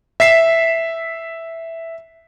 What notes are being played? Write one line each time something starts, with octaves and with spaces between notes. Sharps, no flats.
E5 B6 C7 E7